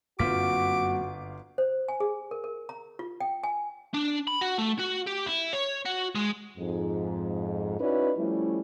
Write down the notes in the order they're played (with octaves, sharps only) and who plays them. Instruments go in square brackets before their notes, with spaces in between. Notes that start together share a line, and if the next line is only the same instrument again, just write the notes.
[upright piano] G1 F4 B6 [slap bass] F#2 A#3 C4 [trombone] F#4 [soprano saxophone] D6
[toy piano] C5
G#5
G#4
A#4
A#4
A#5
F4
G5
G#5
[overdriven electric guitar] D4
B5
F#4
A3
F#4
G4
E4
C#5
F#4
G#3
[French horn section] F2 G#2
C#4 D#4 E4 F#4 B4 D5
F3 G3 A3 C#4 E4